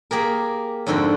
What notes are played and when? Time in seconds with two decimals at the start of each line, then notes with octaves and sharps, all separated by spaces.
0.11 A#3 G4 G#4 A#4
0.87 F2 G#2 D3 F#4 G5